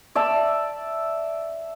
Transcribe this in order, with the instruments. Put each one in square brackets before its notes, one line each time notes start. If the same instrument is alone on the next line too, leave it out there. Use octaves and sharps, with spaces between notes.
[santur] D5 E5 A5